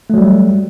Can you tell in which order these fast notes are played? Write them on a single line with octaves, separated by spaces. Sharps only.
A3 F#3 G3